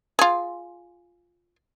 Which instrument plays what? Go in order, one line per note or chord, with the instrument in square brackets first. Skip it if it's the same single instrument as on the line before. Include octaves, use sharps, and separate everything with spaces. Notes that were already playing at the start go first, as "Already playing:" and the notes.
[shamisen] F4 G#4